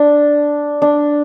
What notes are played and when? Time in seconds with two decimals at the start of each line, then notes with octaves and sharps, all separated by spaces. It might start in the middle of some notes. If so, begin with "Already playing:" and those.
Already playing: D4
0.82 D4